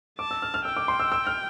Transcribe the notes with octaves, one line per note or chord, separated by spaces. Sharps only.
A5 D6
E6
F6
F6
G5 E6
D6
C6
E6
E6
F6